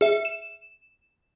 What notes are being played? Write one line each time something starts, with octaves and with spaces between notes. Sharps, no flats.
G#4 E5
E7